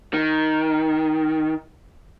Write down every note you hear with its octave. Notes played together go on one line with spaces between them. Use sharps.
D#3